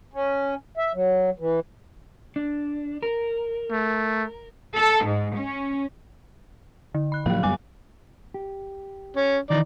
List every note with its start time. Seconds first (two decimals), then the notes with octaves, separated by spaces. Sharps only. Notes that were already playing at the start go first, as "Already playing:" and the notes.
0.14 C#4
0.77 E5
0.94 F#3
1.39 E3
2.36 D4
3.03 A#4
3.71 A3
4.76 A4
5.05 G#2
5.37 C#4
6.94 D3
7.12 B5 F#6
7.26 A2 F3 F#3 A#3 F5
7.43 F#2 G3 B3 G#5 D6 F#6
8.34 G4
9.17 C#4
9.50 D#3 E3 D#4 D5